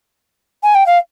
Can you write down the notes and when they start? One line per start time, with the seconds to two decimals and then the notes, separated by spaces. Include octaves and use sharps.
0.63 G#5
0.74 G5
0.86 F5